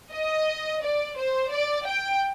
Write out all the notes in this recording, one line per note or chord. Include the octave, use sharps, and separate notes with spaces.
D#5
D5
C5
D5
G5